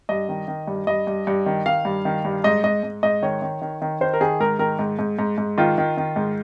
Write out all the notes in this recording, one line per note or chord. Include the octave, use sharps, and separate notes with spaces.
G2 D#5
D#3
D#3
G2
G2 D#5
G2
G2
D#3
D#3 F5
G2
D#3
G2
G#2 D#5
G#2 D#5
G#2
G#2 D#5
D#3 C#5
D#3
D#3
D#3
D#3 C5
A#4
D#3 G#4
G#2 A#4
D#3 A#4
G#2
G#2
G#2
G#2
D#3 F4
D#3
D#3
G#2